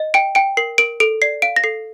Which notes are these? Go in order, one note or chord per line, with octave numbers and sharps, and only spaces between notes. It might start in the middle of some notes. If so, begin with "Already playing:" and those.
Already playing: D#5
G5 D7
G5 D7
A#4 C7
A#4 D7
A4 D7
D5 C7
F5 D7
A#6
A4 C7